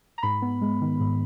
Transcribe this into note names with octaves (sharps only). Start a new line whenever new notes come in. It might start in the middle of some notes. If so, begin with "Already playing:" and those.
A#5
G#2 B5
B3
G#3
D#3
G#2